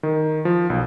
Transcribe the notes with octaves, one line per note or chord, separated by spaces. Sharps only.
D#3
F3
B1